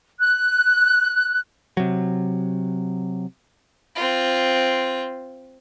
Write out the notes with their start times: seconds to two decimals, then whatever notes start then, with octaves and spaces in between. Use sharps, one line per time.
0.19 F#6
1.77 C3 F#3
3.95 C4 F4